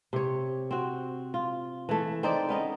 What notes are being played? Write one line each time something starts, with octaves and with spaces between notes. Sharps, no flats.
C3 C#5
C4 F#4
F4
E3 A3
C4 D#4 C5 D5
B3 C#4 D#4 D#5